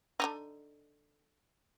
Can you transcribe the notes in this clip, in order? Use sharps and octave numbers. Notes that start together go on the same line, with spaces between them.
D3 D#3 D#4